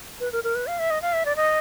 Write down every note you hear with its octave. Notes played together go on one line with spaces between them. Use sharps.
B4
A#4
A#4
B4
F5
E5
D#5
F5
E5
D5
D#5